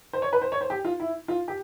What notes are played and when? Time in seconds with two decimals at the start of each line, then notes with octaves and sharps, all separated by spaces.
0.13 C5
0.22 C#5
0.33 B4
0.42 C5
0.52 C#5
0.61 C5
0.70 G4
0.85 F4
1.00 E4
1.28 F4
1.48 G4